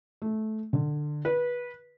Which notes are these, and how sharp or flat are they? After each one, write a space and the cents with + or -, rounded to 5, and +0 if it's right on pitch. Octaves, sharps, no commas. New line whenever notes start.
A3 -15
D3 +20
B4 -20